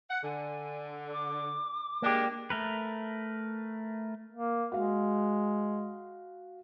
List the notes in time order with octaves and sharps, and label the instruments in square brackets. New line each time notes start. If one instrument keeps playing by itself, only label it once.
[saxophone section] F#5
[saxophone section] D3 [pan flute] G#5
[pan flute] D6
[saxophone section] G#3 D4 [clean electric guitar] A#3 G4
[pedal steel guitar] A3 A#4 B4
[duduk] A#3
[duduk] G#3 [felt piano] F#4 F5